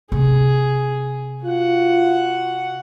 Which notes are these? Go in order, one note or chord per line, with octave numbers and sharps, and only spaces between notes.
C3 G#4
F4 F#4 F#5